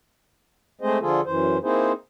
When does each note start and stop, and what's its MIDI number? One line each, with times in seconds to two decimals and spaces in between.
0.81 0.98 56
0.81 0.98 57
0.81 0.98 60
0.81 0.98 68
0.81 0.98 72
0.81 0.98 75
1.01 1.21 50
1.01 1.21 53
1.01 1.21 65
1.01 1.21 68
1.01 1.21 69
1.25 1.58 42
1.25 1.58 52
1.25 1.58 72
1.63 1.92 58
1.63 1.92 60
1.63 1.92 63
1.63 1.92 64
1.63 1.92 68
1.63 1.92 72